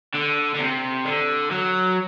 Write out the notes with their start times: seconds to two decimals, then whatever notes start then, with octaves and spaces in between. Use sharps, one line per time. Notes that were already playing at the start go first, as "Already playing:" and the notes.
0.14 D3
0.54 D3
0.59 C3
1.05 D3
1.51 F#3